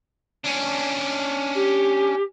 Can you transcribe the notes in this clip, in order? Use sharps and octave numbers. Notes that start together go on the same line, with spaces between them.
C#4 D4
G4